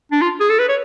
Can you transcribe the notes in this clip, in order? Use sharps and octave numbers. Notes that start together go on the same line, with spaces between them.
D4
F4
G#4
A4
B4
C#5